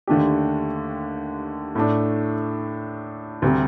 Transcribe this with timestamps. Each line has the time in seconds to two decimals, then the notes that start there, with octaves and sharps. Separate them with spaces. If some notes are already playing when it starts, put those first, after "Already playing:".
0.07 D#2 D3 A3 D4 G4
1.75 A2 A3 D4
3.42 D2 C3 G3 C4